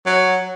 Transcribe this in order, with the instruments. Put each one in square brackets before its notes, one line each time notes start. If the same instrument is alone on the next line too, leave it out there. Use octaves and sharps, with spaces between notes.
[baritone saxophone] F#3